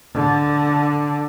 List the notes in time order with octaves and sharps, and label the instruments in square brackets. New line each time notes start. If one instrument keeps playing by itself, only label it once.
[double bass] D3